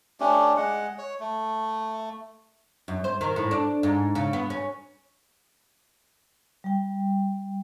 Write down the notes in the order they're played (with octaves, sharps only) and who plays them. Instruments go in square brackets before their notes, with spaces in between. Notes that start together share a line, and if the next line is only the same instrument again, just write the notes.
[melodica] A3 C#4 D4 G4
G#3 F#5
C#5
A3
[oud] F#2
C5
D#3
A2
D4
G#2
C#3
B3
C#4
[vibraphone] G3 G5